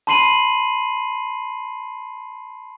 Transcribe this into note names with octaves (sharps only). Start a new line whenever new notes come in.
A5 B5 C6 C7 D#7 F#7